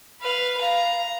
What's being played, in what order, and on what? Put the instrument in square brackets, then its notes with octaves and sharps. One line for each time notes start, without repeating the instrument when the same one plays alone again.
[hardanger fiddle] B4 F5
[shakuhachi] F5 [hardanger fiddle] A#5